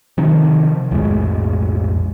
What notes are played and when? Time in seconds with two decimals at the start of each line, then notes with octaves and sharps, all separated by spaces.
0.18 C3 D#3 F3
0.91 B1 F2 A2 G#3